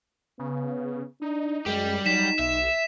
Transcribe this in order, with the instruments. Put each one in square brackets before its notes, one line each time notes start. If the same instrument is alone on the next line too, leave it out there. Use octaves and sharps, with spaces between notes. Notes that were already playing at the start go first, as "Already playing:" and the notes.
[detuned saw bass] C#3 [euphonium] B3
[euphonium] D4 [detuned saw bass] D#4
[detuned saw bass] F#2 [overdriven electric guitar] G3 G4 [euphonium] G#3
[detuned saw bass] F#3 [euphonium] D#4 [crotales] B6 E7
[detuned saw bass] B1 [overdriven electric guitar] E5